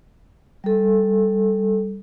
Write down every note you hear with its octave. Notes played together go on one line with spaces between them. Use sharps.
G3 A4